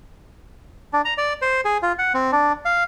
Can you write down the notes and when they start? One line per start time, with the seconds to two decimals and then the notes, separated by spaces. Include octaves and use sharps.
0.93 D4
1.05 A#5
1.18 D5
1.42 C5
1.65 G#4
1.83 F4
1.99 F#5
2.14 C4
2.32 D4
2.65 F5